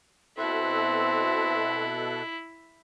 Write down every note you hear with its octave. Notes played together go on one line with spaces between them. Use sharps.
B2 C4 E4 A4 E5 F#6